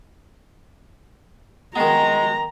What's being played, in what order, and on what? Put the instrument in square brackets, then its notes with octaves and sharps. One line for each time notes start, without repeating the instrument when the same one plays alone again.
[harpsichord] D#3 B3 [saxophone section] G#3 [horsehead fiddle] A#5